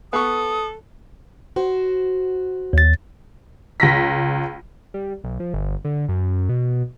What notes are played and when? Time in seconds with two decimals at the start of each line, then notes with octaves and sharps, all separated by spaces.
0.13 B3 A4 C#6 D#6
1.56 F#4 C5
2.73 D#2 A6
3.80 C#2 A#6 B6
4.94 G3
5.24 B1
5.40 F3
5.54 G1
5.85 D3
6.09 F#2
6.49 B2